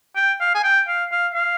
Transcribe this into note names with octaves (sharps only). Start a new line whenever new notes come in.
G5
F5
G#5
G5
F5
F5
F5